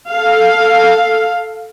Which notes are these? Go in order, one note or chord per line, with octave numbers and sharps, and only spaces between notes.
A4 F5